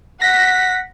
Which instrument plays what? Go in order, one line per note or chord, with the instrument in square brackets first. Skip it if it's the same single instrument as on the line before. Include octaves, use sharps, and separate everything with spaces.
[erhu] F#5 [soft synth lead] A#6 [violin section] B6